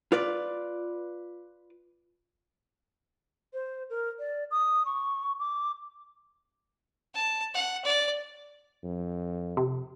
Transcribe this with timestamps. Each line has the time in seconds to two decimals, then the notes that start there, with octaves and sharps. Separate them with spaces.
0.12 F4 B4 D5
3.53 C5
3.90 A#4
4.19 D5
4.51 D#6
4.86 C#6
5.39 D6
7.14 A5
7.54 F#5
7.85 D5
8.84 F2
9.57 C3